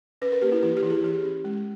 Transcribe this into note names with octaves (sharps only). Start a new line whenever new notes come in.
C#4 B4
A#4
A#3 G4
E4
E3 E4
G4
E3
G#4
E3 G4
C#4
G#3